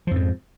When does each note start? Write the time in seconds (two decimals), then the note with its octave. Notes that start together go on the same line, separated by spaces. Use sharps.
0.07 F3
0.11 F2
0.15 G#2